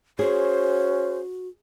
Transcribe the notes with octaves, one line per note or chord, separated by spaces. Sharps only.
C#4 F#4 G#4 C5